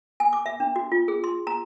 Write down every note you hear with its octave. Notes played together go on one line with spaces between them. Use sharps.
G#5
D6
E5
D4
F#4
F4
G#4
C6
A#5